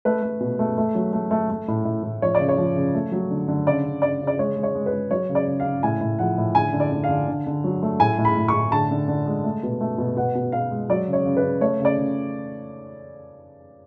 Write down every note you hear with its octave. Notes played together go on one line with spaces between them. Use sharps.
A3 B4
A3
B2
A3
A3
F#3
A3
A3
A3
A2
A2
A2
F3 C#5
C#3 D5
C#5
F3
C#3
A3
F#3
D3
D3
C#3 D5
C#3
C#3 D5
C#3
D5
G#3 C#5
G#3
C#5
G#3
B4
G#3
F#3 C#5
C#3
D5
C#3
F5
C#3
A2 G#5
A2
F3 F#5
A2
D3 G#5
D3
D5
D3
F5
D3
D3
D3
F#3
A3
A2 G#5
A2
B5
A2
C#6
A2
D3 A5
D3
D3
G#3
A3
B2
A3
B2
B2 F#5
B2
B2 F5
G#3
F#3 D5
C#3
C#5
C#3
B4
C#3
A3 C#5
C#3 D5
C#3